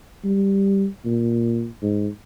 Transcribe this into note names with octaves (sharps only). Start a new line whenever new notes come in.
G3
A#2
G#2